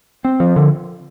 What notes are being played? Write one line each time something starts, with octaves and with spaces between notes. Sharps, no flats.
C4
F3
D3